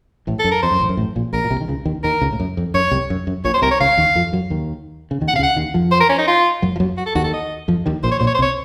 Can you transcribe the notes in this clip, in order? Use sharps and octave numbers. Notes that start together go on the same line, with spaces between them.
A1 A2
A4
F#2
A#4
F2 C5
F#2
A1 A2
F#2
A1 A2
A#1 A#2
A#1 A#2 A#4
A#2
C2 C3
D#3
C#2 C#3
D#2 D#3
D#2 D#3 A#4
C#2 C#3
A2
F#2
F2
F#2 C#5
C2 C3
F#2
F#2
A#1 A#2 C#5
C5
C2 C3 A#4
C#5
C#2 C#3 F5
D#2 D#3
F2 F3
F#2 F#3
D#2 D#3
C#3
D#2 D#3
F#5
C3 F5
C#2 C#3
F#5
D#2 D#3
F2 F3
C5
A#4
C#4
D#4
F4
F#2 F#3
F3
F#2 F#3
F#4
A4
D#2 D#3 F#4
A4
D#5
F2 F3
D#2 D#3
A#1 A#2 C5
C#5
A#1 A#2 C5
C#5
C5
C2 C3
C#5